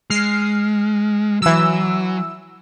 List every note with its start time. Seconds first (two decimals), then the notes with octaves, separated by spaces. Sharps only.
0.10 G#3 F6 C7
1.42 E3 F#3 E6